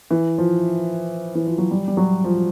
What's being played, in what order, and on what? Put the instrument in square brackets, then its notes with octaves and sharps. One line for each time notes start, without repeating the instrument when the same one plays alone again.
[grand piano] E3
F3
E3
F3
F#3
G3
G3
F#3
F3